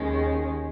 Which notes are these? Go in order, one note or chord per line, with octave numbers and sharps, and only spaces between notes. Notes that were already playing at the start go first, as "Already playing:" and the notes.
Already playing: D#2 D#3 G#3 C#4